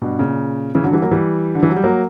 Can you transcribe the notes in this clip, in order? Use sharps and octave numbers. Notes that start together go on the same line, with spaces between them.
G2 B2
A#2 C#3
C#3 E3
D3 F#3
E3 G3
F#3 A#3
E3 G3
D3
E3
F#3
G3
F#3 A#3